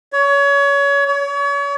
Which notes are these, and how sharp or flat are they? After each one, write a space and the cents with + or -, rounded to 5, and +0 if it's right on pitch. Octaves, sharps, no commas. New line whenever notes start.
C#5 +25
C#5 +35